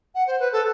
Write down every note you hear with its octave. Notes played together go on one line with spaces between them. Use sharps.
F#5
C5
B4
A4